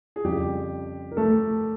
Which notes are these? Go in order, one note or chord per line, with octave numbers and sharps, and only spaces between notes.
G#4
F2 C#3 F3 G3 G4
A#4
A3 A4